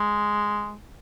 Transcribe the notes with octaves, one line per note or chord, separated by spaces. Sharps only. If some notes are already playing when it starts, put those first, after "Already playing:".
Already playing: G#3